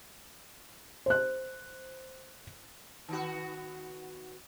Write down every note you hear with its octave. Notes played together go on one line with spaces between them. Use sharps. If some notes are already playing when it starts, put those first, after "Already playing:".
C5 F#6
D#3 B3 F#4